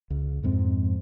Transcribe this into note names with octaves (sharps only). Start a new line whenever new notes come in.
C#2
F2 G#2 C4